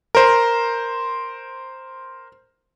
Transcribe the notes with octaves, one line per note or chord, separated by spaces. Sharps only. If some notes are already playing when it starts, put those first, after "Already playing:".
A#4 C5